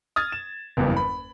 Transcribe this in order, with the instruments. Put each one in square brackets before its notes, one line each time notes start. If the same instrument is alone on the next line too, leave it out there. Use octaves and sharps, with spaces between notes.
[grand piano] D#6 F6 G#6 A6
E7
F#1 E2 G2
B5